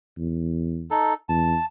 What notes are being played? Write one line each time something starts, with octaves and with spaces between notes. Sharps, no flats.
E2
D#4 A4
E2 A5